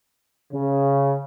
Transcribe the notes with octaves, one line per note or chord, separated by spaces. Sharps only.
C#3